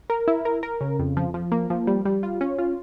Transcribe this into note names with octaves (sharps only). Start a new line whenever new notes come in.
A#4
E4
A#4
A#4
C#3
F2
F3
F3
A#3
F3
G3
G3
F4
C#4
F4